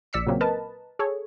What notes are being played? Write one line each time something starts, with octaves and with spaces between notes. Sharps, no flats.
A#1 D5 E6 B6 C#7
A#2 C#3 F#3 A#3 C4
A#4 B4 D#5 A5
G#4 A4 C#5